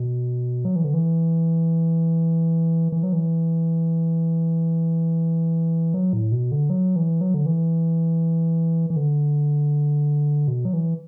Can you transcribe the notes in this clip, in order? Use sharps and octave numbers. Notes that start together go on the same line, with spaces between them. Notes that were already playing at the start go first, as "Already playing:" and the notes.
Already playing: B2
F#3
E3
D3
E3
E3
F#3
E3
F#3
A2
B2
D3
F#3
E3
F#3
D3
E3
E3
D3
B2
F#3
E3